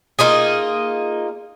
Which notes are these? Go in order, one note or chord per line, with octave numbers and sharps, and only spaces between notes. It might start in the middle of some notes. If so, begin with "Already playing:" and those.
A#3 D#4 F4 G#4